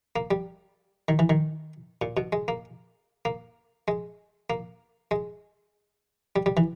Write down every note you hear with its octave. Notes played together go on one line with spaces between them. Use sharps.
A#3
G3
D#3
E3
D#3
A#2
B2
G#3
A#3
A#3
G#3
A#3
G#3
G3
G3
E3